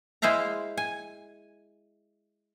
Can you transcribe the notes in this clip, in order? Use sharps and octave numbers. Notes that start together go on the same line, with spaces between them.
G#3 E4 C5 E5 F5 A#5
G#5